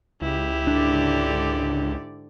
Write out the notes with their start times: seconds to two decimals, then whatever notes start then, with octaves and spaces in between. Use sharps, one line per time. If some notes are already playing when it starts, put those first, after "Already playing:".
0.22 C#2 E4 G4
0.67 G#2 D3 D4 D5